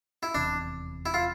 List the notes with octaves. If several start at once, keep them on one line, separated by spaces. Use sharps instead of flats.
E4
F1 E2 C3 D4
E4
F4